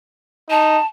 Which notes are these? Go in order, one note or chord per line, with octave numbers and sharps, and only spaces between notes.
D#4 A5